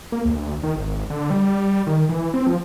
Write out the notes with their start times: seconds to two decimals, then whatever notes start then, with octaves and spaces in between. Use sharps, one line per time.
0.12 A#3
0.25 D2
0.63 D#3
0.76 G#1
1.10 D3
1.30 G3
1.87 D#3
2.09 E3
2.34 C4
2.47 F3